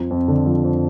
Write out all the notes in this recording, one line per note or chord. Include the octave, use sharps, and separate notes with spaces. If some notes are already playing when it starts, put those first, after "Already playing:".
Already playing: F2 F3
F2
D3
F3
F2